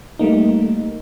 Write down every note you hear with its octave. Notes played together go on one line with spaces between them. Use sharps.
G3 A3 A#3 D#4